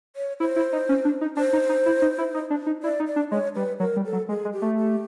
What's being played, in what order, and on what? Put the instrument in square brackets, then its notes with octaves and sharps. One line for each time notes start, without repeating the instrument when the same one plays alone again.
[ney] C#5
[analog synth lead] E4 [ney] C5
[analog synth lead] E4
D#4
C#4
D4
D#4
[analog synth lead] D4 [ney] C5
[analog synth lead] D#4
D#4
E4
D#4
E4
D#4
D4
D#4
[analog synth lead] E4 [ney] D5
[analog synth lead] D#4
[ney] D5
[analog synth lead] D4
[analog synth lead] G#3 [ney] C#5
[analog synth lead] G3 [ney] B4
[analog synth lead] F#3 [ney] A#4
[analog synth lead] G3
[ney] A4
[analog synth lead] F#3
[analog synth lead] G#3 [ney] G#4
[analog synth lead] G#3
[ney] G4
[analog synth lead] A3
[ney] G4